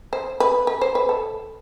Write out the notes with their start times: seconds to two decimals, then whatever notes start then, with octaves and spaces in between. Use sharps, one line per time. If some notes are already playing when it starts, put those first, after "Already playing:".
0.13 C5
0.40 B4
0.67 B4
0.81 C5
0.95 B4
1.09 A4